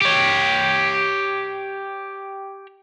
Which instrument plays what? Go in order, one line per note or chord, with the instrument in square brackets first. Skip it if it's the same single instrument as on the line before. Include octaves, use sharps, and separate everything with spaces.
[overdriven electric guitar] G4 C#5